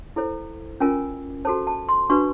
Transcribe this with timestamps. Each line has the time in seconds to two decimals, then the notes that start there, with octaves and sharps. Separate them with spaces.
0.16 E4 A4 C5
0.80 C#4 F4 A#4 G#5
1.45 F#4 A4 C5 A5
1.67 A5
1.89 C6
2.10 D4 F#4 B4 C#6